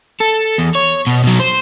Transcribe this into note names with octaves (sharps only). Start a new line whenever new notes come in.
A4
E2
C#5
B2
B2 F#3
C5